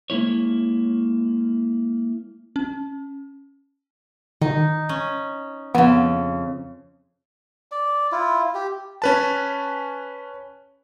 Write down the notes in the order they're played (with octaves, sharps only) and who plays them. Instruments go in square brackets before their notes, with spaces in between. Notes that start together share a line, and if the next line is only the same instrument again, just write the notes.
[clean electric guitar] G#3 A#3 E4 C#5
[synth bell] C#4
[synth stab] D#3 [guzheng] D#4
[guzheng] C#4
[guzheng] F2 C#3 [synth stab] B3
[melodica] D5
E4 F4
G4
[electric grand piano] C#4 B4 A5